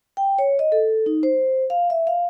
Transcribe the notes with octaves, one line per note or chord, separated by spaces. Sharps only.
G5
C#5
D#5
A4
D#4
C5
F5
E5
F5